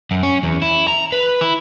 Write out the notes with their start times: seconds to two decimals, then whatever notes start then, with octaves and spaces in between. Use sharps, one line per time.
0.11 F#2
0.23 C#4
0.43 E2
0.62 E4
0.88 A#5
1.12 B4
1.41 E4